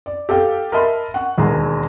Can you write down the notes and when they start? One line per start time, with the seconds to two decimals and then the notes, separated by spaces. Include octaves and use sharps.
0.06 D5
0.29 G4 A4 F5 G5
0.72 A#4 D#5 E5 A5 B5 C6
1.14 F#5 C#6
1.38 E1 D#2 G#4 A#5